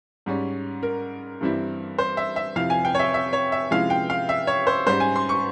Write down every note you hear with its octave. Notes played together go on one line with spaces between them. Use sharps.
G#2 G3 C#4
A#4
G2 E3 G3 C4 E4
C5
E5
E5
F2 C3 F3 C4 E4 F5
G#5
G5
C#5
E5
E5
C#5
E5
C3 F3 G#3 C#4 E4 F5
G5
F5
E5
C#5
C5
G#2 G3 C#4 C5
G#5
C6
C#6